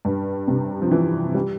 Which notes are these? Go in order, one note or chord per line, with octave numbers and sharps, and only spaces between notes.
G2
C3
F3
E3
G3